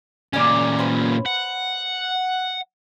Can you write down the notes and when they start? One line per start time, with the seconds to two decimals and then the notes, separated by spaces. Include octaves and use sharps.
0.33 A#2 C#3 A3 C#4 D5
0.79 B4 C5
1.26 F#5